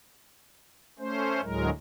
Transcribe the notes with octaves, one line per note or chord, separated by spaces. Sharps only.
A3 C#4 C5
D2 A2 F#3 G#3 A#4